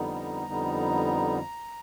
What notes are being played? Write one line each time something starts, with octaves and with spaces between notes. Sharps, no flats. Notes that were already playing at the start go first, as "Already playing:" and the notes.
Already playing: F2 D3 G3 B3 D#4
A#5
F2 D3 G3 B3 D#4